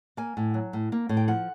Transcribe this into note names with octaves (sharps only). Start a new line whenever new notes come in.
A#3 G#5
A2
F#3
A2
A#3
A2
G5
F3 F#5